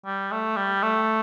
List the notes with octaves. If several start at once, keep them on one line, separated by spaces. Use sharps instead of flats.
G3
A3
G3
A3